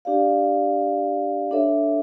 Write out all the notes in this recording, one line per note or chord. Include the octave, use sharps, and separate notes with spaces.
D4 G4 D5 F5
D4 A4 C#5 E5